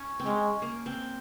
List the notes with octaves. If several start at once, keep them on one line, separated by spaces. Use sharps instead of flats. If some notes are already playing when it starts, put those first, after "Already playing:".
Already playing: C#4
C4
G#3 C#4
A#3
C4